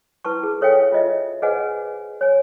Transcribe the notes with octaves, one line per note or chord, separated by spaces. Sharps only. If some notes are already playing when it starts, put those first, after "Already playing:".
E4 B4 A5 C#6
G#4
A4 C#5 E5 F5 G5 G#5
F4 D#5 E5
G#4 B4 C5 D#5 F#5 G#5
C#5 G#5